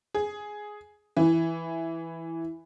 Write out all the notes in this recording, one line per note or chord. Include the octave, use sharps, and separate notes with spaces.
G#4
E3